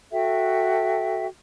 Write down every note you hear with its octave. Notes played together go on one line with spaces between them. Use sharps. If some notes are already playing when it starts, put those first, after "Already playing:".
F#4 A4 E5 G5